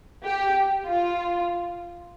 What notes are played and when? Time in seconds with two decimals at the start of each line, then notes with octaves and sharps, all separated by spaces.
0.24 G4
0.86 F4